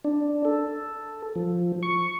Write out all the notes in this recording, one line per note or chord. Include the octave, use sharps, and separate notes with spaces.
D4
A4
F3
C#6